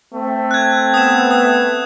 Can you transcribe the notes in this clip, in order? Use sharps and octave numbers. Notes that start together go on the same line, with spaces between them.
A3 C4
F#6 G#6
B3 D#6 E7
D#6